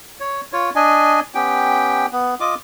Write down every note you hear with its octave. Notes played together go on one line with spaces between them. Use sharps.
C#5
F4 C#5
D4 D#5 G#5
B3 C#4 G4 G5
B3
F4 D#5 D6